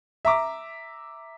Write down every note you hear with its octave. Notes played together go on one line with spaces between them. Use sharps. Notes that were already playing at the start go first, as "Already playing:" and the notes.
E5 A#5 D6